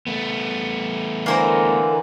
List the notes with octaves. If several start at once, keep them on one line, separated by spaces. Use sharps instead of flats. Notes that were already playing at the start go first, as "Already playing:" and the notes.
A3 B3
D3 E3 A#3 A#4 C5